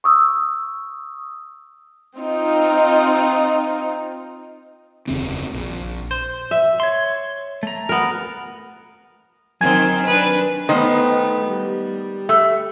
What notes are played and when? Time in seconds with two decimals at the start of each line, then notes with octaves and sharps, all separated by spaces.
0.04 C#6 D#6 E6
2.16 C4 D#4 F4
5.07 F1 D#2 C#3 C4
5.53 A#1
6.11 C5
6.51 E5
6.80 C#5 C6
7.63 A3 A#5
7.89 B3 A#4
9.61 D#3 F#3 C4 G#5 G#6
10.07 D4 B4
10.69 D#3 A3 B3 D#4 C5
11.46 G3
12.29 A3